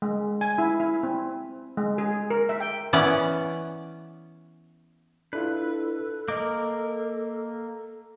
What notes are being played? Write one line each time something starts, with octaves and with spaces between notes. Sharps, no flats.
G#3
G#5
E4
E4
C4
G#3
G#4
A#4
E5
G5
E3 B3 C#4 D5
D4 E4 F4 A4 B4
A#3 A#4 D#5 D6